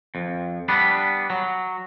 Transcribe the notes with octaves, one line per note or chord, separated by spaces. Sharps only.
F2
G3 B3 D4 B4
F#3